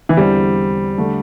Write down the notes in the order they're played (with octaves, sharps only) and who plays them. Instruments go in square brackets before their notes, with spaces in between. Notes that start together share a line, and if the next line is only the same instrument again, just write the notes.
[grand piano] E3
[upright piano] E2 D3 C4 E4 [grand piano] G3
[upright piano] D3 A3 D4